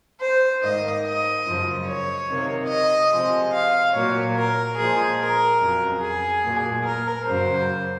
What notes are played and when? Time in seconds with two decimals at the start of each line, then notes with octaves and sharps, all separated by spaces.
0.22 C5
0.62 G#2 D#3 A#3 D#5
1.05 D#5
1.46 F#2 C#3 F3 A#3
1.88 C#5
2.29 C3 D#3 A#3
2.70 D#5
3.12 C3 F3 G#3
3.54 F5
3.94 A#2 F#3 A#3 C#5
4.36 A#4
4.78 A#2 F3 G#3 G#4
5.20 A#4
5.61 F2 C#3 F#3
6.03 G#4
6.44 A#2 F#3 A#3
6.86 A#4
7.27 F#2 C#3 F#3 A#3 C5